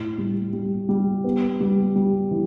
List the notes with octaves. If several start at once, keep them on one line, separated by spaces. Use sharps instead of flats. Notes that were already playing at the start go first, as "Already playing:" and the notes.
Already playing: A2
G3
G3
G3
B3
G3
G3
E3